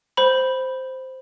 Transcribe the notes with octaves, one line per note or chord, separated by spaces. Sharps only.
C5 B5